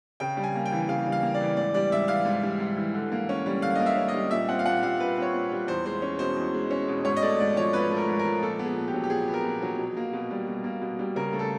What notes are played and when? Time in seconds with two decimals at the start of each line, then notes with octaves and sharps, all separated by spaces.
0.20 C#3 G5
0.37 G3
0.44 G#5
0.55 A#3
0.66 G5
0.72 E3
0.88 C#3 F5
1.06 G3
1.12 F5
1.23 A#3
1.34 D5
1.41 E3
1.57 G#2 D5
1.74 G3 D5
1.91 G#2 E5
2.08 E3 F5
2.25 G#2
2.43 G3
2.60 G#2
2.77 E3
2.94 D3
3.12 A#3
3.29 C#4
3.46 G3
3.62 D3 F5
3.75 A#3 D#5
3.86 E5
3.96 C#4
4.08 D#5
4.14 G3
4.31 A#2 E5
4.48 C4 F#5
4.59 F5
4.66 A#2 F#5
4.82 G3 F5
5.00 A#2 B4
5.17 C4 C#5
5.34 A#2
5.52 G3
5.68 E2 C5
5.86 G#3 C5
6.02 C#4
6.19 B2 C5
6.37 E2
6.54 G#3
6.71 C#4
6.88 B2
7.05 G#2 C#5
7.17 D#5
7.22 A3 D5
7.39 G#2 D5
7.57 F3 C#5
7.73 G#2 B4
7.91 A3
7.97 A#4
8.08 G#2
8.19 A#4
8.24 F3
8.42 A#2 A4
8.59 B3
8.65 G#4
8.77 A#2
8.88 G4
8.94 F#3
9.03 G4
9.10 A#2 G#4
9.28 B3
9.34 A#4
9.44 A#2
9.62 F#3
9.78 B2
9.97 A#3
10.13 B2
10.31 G3
10.47 B2
10.64 A#3
10.81 B2
10.99 G3
11.16 C#3 A#4
11.33 A3
11.39 A4